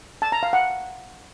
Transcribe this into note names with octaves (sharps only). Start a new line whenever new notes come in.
A5
A#5
F5
F#5